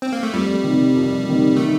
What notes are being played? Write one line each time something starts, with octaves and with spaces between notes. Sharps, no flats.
C4
A#3
A3
F2 G3
C3 D#3
F2
C3 D#3
D#3 A3